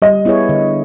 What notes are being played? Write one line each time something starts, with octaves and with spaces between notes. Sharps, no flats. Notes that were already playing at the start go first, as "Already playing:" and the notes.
G3 D#5
B3 E4 G#4 C#5
D3